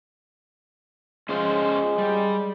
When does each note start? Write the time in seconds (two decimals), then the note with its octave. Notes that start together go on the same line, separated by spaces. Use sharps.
1.29 G#3 C#4 F4 C5
1.98 G3